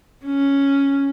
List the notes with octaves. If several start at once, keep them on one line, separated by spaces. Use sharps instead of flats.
C#4